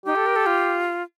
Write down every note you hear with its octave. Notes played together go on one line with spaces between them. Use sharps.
D#4 G4
A4
A#4
A4
F4